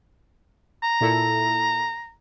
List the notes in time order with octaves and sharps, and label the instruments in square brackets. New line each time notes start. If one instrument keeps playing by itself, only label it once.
[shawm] A#5
[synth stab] A#2 E4 A4